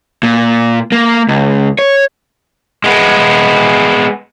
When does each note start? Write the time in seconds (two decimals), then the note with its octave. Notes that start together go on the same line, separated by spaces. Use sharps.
0.23 A#2
0.92 A#3
1.28 C#2
1.79 C#5
2.84 G#3 B3